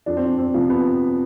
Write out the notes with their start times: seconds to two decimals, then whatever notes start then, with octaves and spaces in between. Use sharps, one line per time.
0.06 F2 D4
0.17 C4
0.26 D4
0.38 C4
0.54 C3 F3
0.70 B3